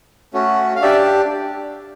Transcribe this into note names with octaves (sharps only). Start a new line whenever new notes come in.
A3 C#4 F#4
F5
D4 G4 D5 E5